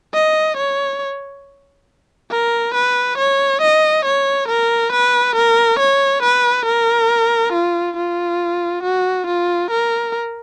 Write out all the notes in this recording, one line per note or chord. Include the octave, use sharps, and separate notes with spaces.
D#5
C#5
A#4
B4
C#5
D#5
C#5
A#4
B4
A#4
C#5
B4
A#4
F4
F4
F#4
F4
A#4